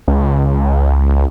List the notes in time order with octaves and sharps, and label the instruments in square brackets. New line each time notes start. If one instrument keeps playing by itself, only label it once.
[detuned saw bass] C#2